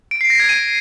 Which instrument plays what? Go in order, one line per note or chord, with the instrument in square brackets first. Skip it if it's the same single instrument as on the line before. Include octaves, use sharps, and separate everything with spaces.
[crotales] D7
C7
A#6
G#6
D#7